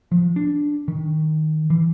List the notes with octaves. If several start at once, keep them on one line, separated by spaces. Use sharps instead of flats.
F3
D4
D#3
E3